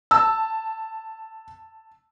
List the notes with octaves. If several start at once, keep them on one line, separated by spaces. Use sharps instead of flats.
A5 E6